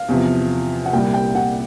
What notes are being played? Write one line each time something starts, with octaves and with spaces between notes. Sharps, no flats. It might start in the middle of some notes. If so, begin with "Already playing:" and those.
Already playing: F5
E2 C3 F3
F#5
C2 A#2 G3 G5
G5
F#5